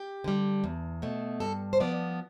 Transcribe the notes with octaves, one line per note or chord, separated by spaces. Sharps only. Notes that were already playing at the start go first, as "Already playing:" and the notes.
Already playing: G4
D3 G3
E2
B2 A3
G2 A4
C5
F3 B3 D5